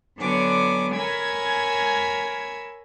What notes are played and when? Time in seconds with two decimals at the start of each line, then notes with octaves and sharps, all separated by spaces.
0.17 D3 F#3 B3 D4 G#5 D6
0.93 A#4 C#5 G#5 B5 E6 G#6